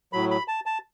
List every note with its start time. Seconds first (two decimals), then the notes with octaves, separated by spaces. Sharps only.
0.13 A2 F#3 B5
0.31 B5
0.48 A5
0.66 A5